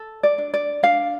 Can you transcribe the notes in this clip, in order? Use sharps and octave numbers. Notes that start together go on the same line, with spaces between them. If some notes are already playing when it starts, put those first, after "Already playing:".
Already playing: A4
D5
D4
D5
D4 F5